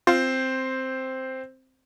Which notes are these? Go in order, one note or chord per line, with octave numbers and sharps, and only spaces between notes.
C4 F4 C5 F5